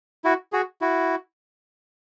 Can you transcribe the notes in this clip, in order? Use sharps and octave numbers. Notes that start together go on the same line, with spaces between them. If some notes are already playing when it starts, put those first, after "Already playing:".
E4 F#4
F#4 G#4
E4 F#4